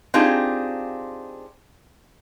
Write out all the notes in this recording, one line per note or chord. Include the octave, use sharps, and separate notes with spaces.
C4 D4 D#4 F4 G4 G#4